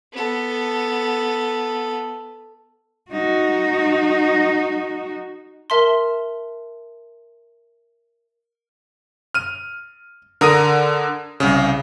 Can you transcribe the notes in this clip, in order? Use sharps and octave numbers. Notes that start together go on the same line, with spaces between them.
B3 A4
D#4 F#4
A#4 E5 A5 C6
F6 D#7
D3 A#4 D#6 A#6 D#7
C2 C#3